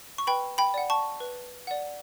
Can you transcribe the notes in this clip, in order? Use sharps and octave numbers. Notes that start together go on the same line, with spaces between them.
C#6
B4 G5 B5
G5 B5
D5 F#5
A5 C#6
B4
D5 F#5